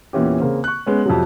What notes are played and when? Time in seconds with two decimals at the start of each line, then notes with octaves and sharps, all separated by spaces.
0.13 E2 A#2 E3 C#4 G4
0.40 C#3 A#3 C4
0.64 C#6 F#6
0.86 G#3 B3 C#4
1.06 F2 C3 F#3